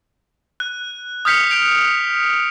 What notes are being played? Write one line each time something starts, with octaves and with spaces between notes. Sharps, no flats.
F#6
D#6 F6 G6 B6 C#7 F7
G6 D7 F7